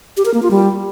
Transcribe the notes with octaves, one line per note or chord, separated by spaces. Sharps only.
G4
A#4
A#3
F4
G3